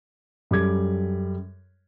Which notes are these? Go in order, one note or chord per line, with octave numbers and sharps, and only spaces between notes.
F#2 G3 A4 D6 G#6